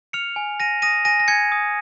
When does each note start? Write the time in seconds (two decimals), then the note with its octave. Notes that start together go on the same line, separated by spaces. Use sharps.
0.13 F6 C#7 F7
0.36 G#5
0.60 G#5 A#6 D#7
0.82 D#6 A#6 D#7
1.05 G#5 A#6 D#7
1.20 A#6
1.28 G#5 G#6 C#7
1.52 D#6